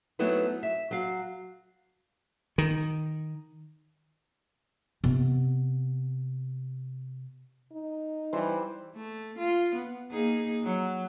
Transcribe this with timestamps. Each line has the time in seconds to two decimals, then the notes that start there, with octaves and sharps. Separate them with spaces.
0.19 F#3 A3 B3 C4 D#4 E4
0.63 E5
0.91 F#3 F5
2.58 D#3
5.04 C3 B3
7.72 D#4
8.33 E3 G3 G4 C5
8.96 A3
9.38 F4
9.75 B3
10.10 A#3 D#4 G#4
10.64 F#3